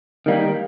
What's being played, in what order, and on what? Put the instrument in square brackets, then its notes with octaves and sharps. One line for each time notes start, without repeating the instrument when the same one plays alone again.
[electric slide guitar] D#3 G3 A#3